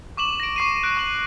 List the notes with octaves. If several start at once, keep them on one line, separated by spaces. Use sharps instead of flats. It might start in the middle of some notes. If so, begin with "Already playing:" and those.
C#6 D6 E7 F#7
A#6 D7
C#6 C7 D#7
F#6 D7
C#6 F#7